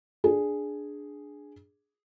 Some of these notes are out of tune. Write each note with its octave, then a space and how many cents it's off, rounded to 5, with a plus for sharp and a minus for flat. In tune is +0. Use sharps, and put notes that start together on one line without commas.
D4 +0 G#4 +0